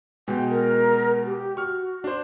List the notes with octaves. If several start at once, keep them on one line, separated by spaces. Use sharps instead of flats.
B2 G#3 G5
A#4
G4
F#4 C#6 F6
D4 C5